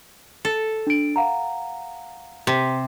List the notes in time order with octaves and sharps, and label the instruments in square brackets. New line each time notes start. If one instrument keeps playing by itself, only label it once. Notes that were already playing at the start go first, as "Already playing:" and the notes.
[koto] A4
[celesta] D4 D7
F5 F#5 A#5
[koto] C3